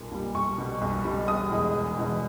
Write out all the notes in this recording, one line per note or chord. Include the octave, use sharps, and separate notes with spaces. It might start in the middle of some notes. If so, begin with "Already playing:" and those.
Already playing: B1 A#2 G3
A#2 G3
B1 C#6
B2 G3
B1
B2 G3
E1 D#6
E2 B2 G#3
E1
E2 B2 G#3